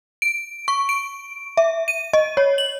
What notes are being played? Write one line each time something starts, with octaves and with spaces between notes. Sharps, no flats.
D7
C#6
D7
E5
D#7
D#5
C#5
F#7